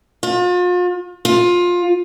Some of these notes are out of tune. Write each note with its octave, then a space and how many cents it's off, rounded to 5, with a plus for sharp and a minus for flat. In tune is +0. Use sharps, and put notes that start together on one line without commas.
F4 +40
F4 +20